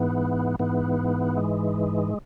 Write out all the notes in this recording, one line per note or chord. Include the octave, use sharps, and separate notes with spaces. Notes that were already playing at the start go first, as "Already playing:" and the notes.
Already playing: G#2 E3 B3
G#2 E3 B3
G#3